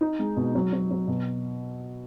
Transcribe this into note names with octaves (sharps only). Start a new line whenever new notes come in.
D#4
G#3
B2
F#3
F#3
F#3
B2